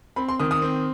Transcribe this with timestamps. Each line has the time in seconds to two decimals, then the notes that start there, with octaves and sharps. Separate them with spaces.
0.16 C4 B5
0.29 C6
0.40 D#3 D#6
0.51 D#6
0.62 C4